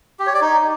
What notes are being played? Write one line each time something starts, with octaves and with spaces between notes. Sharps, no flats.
G4
C#5
D5
D#4